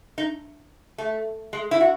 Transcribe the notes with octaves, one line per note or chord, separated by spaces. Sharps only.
D#4
A3
G#3
E4
F#4